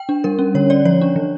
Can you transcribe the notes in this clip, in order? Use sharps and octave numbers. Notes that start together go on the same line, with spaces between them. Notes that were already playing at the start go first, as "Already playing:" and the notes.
Already playing: G5
D4
G3 A#4
C#4
D3 C#5
C#4 D5
F3 C#5
D4
E3